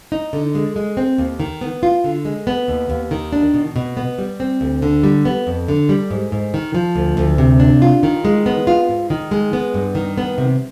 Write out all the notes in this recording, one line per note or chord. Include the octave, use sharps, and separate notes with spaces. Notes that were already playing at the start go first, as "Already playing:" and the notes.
D#4
D3
G#3
G#3
C4
D#2
D#3
B3
F4
D3
G#3
B3
D#2
D#2
D#3
D4
B2
B2
B3
G3
C4
D2
D3
G3
B3
F2
D3
G3
G#2
G#2
D#3
F3
D2
D2
C3
D4
F4
D#3
G#3
B3
F4
G#2
D#3
G#3
B3
G2
D#3
B3
C3